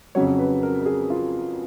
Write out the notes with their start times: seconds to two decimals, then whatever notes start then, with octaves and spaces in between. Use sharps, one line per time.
0.15 F2 C#3 F#3 C#5
0.39 B4
0.63 A#4
0.81 A#4
0.86 G#4
1.10 F4